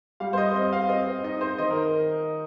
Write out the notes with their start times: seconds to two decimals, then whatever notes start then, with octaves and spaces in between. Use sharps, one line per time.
0.20 G3 F5
0.33 C5
0.38 D#5
0.54 C4 D#5
0.73 F5
0.89 C4 D#5
1.24 D#4 D#5
1.41 C5
1.58 D#3 D#5
1.71 A#4